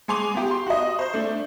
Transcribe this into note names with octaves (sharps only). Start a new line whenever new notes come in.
G#3 G#4 G#5 C6 D6 F7
B3 G4
C6
F#4 D#5
C5 G6
A3 D4